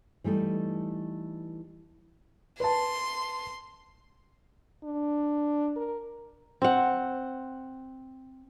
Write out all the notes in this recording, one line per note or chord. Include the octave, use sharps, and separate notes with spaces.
E3 G3 A3 D#4
B4 A5 C6
D4
A#4
C4 F#5